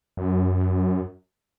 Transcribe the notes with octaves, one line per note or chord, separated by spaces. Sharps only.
F#2